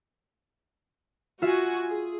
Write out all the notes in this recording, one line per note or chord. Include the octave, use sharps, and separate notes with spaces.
F4 F#4 E5 G#5
G#4